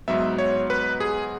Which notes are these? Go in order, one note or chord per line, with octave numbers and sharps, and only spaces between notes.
G#2 F#3 B3 E5
C#5
B4
G#4